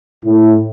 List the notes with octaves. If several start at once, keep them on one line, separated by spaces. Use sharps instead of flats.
A2